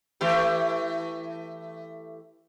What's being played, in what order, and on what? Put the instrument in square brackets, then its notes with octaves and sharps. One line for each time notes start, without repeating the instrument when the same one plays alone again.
[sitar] E3 A3 G4